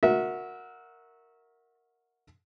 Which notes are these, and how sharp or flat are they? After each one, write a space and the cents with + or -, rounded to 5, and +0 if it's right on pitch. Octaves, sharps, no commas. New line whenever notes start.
F#4 -20 A#4 +0 E5 -25